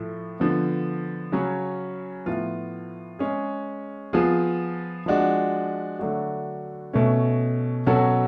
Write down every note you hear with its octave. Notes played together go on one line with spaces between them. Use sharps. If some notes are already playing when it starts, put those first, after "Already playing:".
Already playing: A2 F3 A3
D3 F3 B3
C#3 F#3 C#4
A2 F3 B3 F4
G#3 C#4 G#4
F3 B3 F4 G#4
F3 G#3 D4 F#4
D3 F#3 A3 D4 F#4
B2 A3 C#4
B2 F#3 C#4 F#4 A4